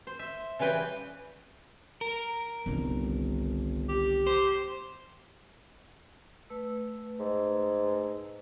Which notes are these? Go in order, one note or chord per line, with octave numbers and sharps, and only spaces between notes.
C5
E5
C#3 E3 G3 B4 G5
A#4
G1 C2 D#3
G4
C5
A3 B4 E6
G#2